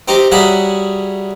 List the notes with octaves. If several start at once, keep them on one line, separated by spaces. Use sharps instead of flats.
C4 D#4 G4
F#3 G3 G#4 E5 F#5